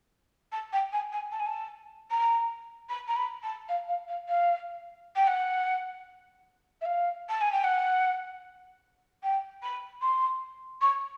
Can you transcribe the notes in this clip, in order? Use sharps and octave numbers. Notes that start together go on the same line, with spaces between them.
A5
G5
G#5
G#5
A5
G#5
A5
A#5
B5
A#5
B5
A5
F5
F5
F5
F5
G5
F#5
E5
F5
A5
G#5
G5
F#5
G5
B5
C6
C#6